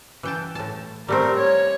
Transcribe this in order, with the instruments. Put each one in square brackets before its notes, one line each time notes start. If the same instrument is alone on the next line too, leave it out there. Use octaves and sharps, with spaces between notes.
[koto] E3 G5 A5
A2 A5
[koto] G3 A3 C4 [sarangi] A#4
[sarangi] C#5